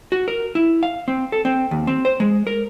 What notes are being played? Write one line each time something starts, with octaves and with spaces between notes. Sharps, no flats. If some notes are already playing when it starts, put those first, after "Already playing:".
F#4
A#4
E4
F5
C4
A4
C4
D#2
C4
C5
G#3
A#4